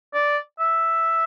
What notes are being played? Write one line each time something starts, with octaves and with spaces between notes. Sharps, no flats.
D5
E5